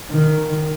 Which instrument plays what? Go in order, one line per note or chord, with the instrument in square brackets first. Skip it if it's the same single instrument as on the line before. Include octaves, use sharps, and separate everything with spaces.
[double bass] D#3